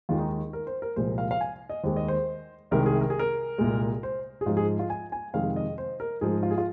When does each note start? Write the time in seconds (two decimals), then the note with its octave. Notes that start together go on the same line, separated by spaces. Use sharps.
0.09 D#2 D#3 G#3 F4
0.19 D#4
0.53 A#4
0.67 C5
0.82 A#4
0.96 C2 A#2 F3 G#3 C5
1.18 F5
1.31 F5
1.41 G#5
1.69 D#5
1.83 D#2 D#3 G#3 C5
1.96 D#5
2.08 C5
2.71 C2 C3 D#3 G#3 A#4
2.86 G#4
3.01 A#4
3.10 G#4
3.19 A#4
3.58 C2 A#2 G#3
4.03 C5
4.41 G#4
4.46 G#2 F3 G#3 F4
4.57 G#4
4.79 F4
4.90 G#5
5.12 G#5
5.34 F2 C3 D#3 G#3 F5
5.56 D#5
5.78 C5
6.00 A#4
6.21 G#2 F3 G#3 G#4
6.43 F4
6.51 G#4
6.58 F4